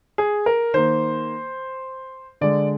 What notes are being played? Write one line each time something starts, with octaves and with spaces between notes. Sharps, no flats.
G#4
A#4
D#3 A#3 C5
D3 G#3 D5